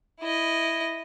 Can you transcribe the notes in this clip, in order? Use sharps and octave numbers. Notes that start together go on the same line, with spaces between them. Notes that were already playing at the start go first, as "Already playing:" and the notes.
E4 D#5